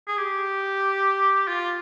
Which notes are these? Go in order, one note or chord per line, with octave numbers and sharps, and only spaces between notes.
G#4
G4
F4